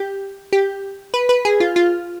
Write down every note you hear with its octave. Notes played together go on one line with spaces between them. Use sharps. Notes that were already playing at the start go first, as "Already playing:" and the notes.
Already playing: G4
G4
B4
B4
G#4
F4
F4